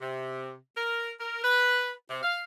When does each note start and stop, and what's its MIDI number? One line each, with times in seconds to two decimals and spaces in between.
0.01 0.55 48
0.77 1.12 70
1.20 1.40 70
1.44 1.92 71
2.10 2.20 48
2.23 2.43 77